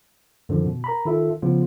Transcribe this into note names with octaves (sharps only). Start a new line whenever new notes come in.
F#2 D3 D#3 F3
B2
A#4 A#5 B5
D#3 F4 A4 E5
C#3 F3 B3 F4